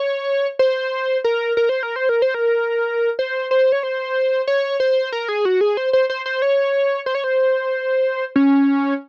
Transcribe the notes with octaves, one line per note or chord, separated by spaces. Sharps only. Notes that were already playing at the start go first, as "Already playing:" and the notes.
Already playing: C#5
C5
A#4
A#4
C5
A#4
C5
A#4
C5
A#4
C5
C5
C#5
C5
C#5
C5
A#4
G#4
F#4
G#4
C5
C5
C5
C5
C#5
C5
C#5
C5
C#4